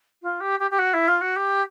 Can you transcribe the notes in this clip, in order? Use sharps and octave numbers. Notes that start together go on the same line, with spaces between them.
F4
G4
G4
G4
F#4
E4
F4
F#4
G4